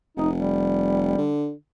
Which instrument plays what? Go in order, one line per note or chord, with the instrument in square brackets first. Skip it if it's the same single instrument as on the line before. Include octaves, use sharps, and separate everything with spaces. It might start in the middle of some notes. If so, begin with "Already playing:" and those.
[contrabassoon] F1 [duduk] D#4
[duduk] G3
[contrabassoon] D3